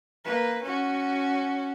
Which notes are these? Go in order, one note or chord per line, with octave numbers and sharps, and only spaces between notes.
A#3 B4
C#4 F#4